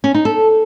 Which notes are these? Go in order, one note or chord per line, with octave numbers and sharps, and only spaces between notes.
C#4
D#4
A4